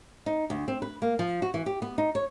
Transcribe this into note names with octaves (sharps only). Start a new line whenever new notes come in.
D#4
D2
C4
B4
A#3
F3
F#4
E3
G4
B3
D#4
C#5